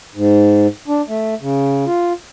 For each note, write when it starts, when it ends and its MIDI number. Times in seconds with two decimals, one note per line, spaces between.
0.16 0.67 44
0.88 1.02 62
1.08 1.35 57
1.41 1.85 49
1.87 2.13 65